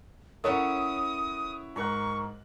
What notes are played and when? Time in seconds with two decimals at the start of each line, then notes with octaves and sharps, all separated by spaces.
0.44 C#4 E4 A4 A#4 C#5 F#5 D#6
1.76 G#2 A#4 C#6 F#6